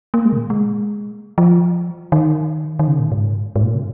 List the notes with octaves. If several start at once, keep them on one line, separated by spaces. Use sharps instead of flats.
A#3
G#3
C#3
A#2
G#3
F3
D#3
D#3
C#3
A#2
G#2
G#2
A#2
C#3